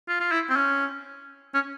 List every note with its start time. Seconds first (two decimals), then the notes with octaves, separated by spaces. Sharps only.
0.08 F4
0.20 F4
0.32 E4
0.50 C4
0.56 C#4
1.54 C#4